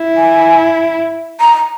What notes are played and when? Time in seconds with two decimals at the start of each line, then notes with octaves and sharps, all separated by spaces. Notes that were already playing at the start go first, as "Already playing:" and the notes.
Already playing: E4
0.17 G#5
1.41 A#5